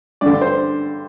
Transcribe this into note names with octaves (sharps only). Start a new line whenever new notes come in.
G2 D3 D5
C5